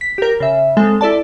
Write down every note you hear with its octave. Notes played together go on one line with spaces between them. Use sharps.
B6
G4 A#4
C#3 E5
G#3 C4 A4
E4 A4 D5 A5